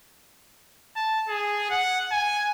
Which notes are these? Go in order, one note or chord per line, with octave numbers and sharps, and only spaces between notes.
A5
G#4
F#5
G#5